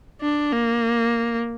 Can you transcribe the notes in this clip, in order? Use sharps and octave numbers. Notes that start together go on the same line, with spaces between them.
D4
A#3